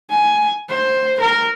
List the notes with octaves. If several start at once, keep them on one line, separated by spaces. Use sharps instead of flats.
G#5
C5
A#4